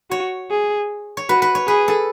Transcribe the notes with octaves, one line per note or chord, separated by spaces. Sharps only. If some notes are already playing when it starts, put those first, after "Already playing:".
F#4 C#5
G#4
C#5
F#4 B4
B4
C#5
G#4 B4
A4